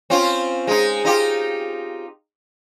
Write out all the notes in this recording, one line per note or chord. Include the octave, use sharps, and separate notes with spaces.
C4 C#4 F4
G#3 D#4
D#4 F4 G4